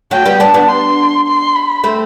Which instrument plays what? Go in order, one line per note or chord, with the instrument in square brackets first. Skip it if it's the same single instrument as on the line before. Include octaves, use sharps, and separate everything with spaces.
[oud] F#3 A3 [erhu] G5
[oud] G3 B3
[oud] B3 D4 [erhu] A5
[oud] B3 D4
[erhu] C6
C6
B5
[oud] A3 C4